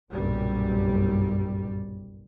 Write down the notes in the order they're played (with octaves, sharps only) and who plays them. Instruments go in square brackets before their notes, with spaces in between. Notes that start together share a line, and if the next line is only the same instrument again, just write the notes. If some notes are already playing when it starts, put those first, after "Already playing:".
[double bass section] F#1 B1 G2 A#2 G3